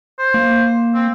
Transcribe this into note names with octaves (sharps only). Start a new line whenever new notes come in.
C5
A#3
C4